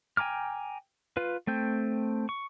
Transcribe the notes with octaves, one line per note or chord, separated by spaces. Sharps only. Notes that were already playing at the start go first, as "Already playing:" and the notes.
G5 G#5 A#5 D6 F6
F4 B4
A3 C4 G5
C#6